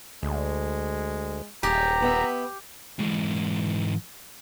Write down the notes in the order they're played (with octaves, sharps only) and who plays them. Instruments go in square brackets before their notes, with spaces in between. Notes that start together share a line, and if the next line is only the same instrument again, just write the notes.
[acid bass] D2 [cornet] G#3
[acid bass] D#1 [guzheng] G4 [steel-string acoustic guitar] G#4 [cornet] A#5
[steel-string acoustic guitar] B3 E5
[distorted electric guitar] G#2 E3